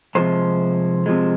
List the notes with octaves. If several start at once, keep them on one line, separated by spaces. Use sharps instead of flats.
C3 F3 G#3 C5
C3 F3 G#3